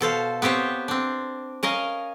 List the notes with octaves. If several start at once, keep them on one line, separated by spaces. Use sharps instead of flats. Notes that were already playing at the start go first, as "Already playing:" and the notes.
B2 A4 C5 F5
B3 C4 G4 C5 C#5
C4 D4
C#4 A#4 D#5 F5